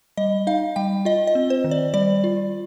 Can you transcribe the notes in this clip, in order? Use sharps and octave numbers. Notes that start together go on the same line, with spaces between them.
G3 D#5
D#4 F5
G3 G5
F4 D#5
D#5
C4
C5
D#3
D5
G3 D5
F4